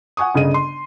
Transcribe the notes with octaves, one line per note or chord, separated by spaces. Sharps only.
F#5 G#5 C#6 D#6
G1 C#3 G#4 D#5 D#7
C6